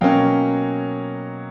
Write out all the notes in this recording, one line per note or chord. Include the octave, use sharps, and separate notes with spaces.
B2 F#3 A#3 C#4 F5 G5